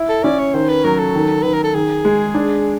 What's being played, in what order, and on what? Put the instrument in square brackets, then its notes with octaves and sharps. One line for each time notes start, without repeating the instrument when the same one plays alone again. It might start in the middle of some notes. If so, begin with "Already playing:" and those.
Already playing: [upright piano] E4
[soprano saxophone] A4
[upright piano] C#4 [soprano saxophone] D5
[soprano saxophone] C#5
[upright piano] D#3 [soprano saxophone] C5
[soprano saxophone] B4
[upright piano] F#3 [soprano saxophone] A#4
[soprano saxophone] A4
[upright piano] D#3
[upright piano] D#3 [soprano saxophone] B4
[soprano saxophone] A#4
A4
[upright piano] D#3 [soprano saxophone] G#4
[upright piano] G#3
D4